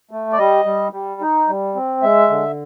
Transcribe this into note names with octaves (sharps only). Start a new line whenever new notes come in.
A3
D5
G3 D#5
G3
G3
D#4
G3
C4
G#3 E5
D3